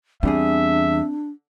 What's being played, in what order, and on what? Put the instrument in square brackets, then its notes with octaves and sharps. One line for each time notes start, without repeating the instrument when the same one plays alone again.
[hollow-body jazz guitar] E2 G3 G#4 [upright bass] C4 [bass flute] D4 [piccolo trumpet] E5